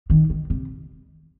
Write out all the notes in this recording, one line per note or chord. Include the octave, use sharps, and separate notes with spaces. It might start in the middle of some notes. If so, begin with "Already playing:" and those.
D#3
D#3
C3